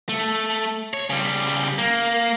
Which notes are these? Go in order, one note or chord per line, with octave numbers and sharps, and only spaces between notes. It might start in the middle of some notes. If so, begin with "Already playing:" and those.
A3
C#5
C#3 G3
A#3